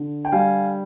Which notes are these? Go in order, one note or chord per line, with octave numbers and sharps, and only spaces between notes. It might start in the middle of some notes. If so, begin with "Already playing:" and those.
Already playing: D3
G5
G3 F5 G#5